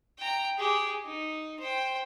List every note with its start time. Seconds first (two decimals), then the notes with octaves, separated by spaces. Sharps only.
0.18 G5 A#5
0.58 G4 G#4
1.05 D#4
1.59 C5 G5